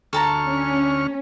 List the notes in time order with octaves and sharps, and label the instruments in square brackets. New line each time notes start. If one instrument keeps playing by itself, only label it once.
[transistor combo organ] D2 C#6 F6 [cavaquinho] A4 A5 A#5
[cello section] C#4